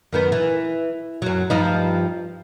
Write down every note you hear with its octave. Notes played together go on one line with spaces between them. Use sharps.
F#2 D#3 B3
E3
F#2 F#3
G2 F3 D#4